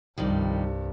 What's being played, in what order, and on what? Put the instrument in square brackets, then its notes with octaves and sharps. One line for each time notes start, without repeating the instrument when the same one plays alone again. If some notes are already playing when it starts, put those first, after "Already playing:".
[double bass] C2 G2 [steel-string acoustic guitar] D#3 F3 G3